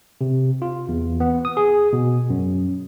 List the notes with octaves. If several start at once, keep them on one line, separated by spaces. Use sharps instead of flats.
C3
F4
E2
B3
D#6
G#4
B2
F#2